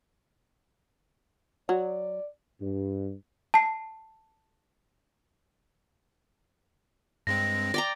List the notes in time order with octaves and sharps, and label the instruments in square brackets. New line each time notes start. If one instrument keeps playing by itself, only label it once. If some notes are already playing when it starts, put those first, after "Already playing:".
[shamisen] F#3 [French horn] D5
[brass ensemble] G2
[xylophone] A5 C7
[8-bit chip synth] G2 G#3 C4 [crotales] A#6
[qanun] D5 G5 A#5